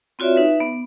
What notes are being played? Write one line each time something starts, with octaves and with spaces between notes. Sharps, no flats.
C4 F4 F#4 C#5 D5 E5
D#4 B4 E5
B3